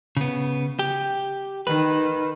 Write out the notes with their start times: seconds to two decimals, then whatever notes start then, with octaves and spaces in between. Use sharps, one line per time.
0.17 C#3 B3
0.79 G4
1.67 D#3 B4